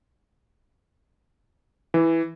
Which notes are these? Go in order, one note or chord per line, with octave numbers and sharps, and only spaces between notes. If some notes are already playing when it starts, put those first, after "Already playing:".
E3